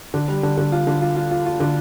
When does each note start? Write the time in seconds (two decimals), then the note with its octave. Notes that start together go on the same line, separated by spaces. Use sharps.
0.14 D3
0.28 G3
0.43 D3
0.57 D3
0.72 F4
0.87 D3
1.02 F4
1.16 F4
1.31 F4
1.46 F4
1.60 D3